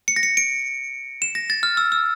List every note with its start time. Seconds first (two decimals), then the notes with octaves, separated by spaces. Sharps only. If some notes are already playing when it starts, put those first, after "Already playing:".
0.08 C#7
0.16 A#6
0.23 C#7
0.37 D7
1.22 E7
1.35 A#6
1.50 A6
1.63 F6
1.77 E6
1.92 E6